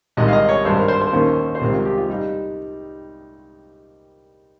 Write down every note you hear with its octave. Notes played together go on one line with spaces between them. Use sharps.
C2 C3 D#3 G#3 D#5
F5
D#5
C#5
G#1 G2 G3 C5
A#4
C5
C5
D#2 D#3 A#3 C#4
C5
C2 C3 D#3 G#3 C4 A#4
F4
G4
F4
G3 D#4